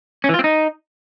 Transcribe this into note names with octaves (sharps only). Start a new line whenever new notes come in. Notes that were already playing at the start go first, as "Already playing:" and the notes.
C#4
E3
F4
C4
D#4